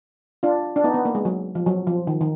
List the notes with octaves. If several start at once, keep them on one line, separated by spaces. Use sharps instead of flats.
D4 F4
D4
B3 D#4
B3
A#3
G#3
F#3
F3
F#3
F3
D#3
D#3